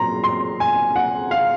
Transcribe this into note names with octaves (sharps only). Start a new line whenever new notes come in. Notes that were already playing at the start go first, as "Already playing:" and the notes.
Already playing: A#2 F#3 A#5 C6
C6
G#5
F#5
F5